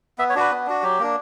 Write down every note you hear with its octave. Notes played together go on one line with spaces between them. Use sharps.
B3 E5
C#5
D4 F#4 B4
B3
D4 F#4
F#3 G4
A#3 D4